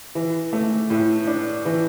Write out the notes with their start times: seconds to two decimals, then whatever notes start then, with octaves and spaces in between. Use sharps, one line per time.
0.15 E3
0.53 A3
0.90 A2
1.27 D4
1.65 E3